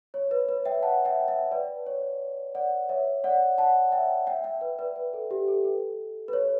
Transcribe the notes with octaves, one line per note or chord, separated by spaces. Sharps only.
C#5
B4
B4
E5 G5
F#5 A5
E5 G5
E5 G5
B4 D5
C#5
D5 F#5
C#5 E5
D5 F#5
F#5 A5
E5 G5
E5 G5
E5 G5
B4
B4 D5
B4
A4
G4
A4
A4
B4
C#5